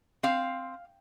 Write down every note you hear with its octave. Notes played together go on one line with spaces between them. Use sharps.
C4 F5